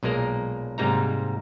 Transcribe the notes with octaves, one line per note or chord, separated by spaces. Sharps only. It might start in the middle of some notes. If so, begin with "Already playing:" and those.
B1 A#2 G#3 A#3 A#4
G#2 C3 G3 A#3 D#4 A#5